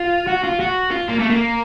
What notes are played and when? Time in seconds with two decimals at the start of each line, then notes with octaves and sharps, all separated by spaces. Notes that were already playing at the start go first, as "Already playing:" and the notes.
Already playing: F4
0.27 F#4
0.44 F4
0.60 F#4
0.91 F4
1.08 A#3
1.19 A3
1.30 A#3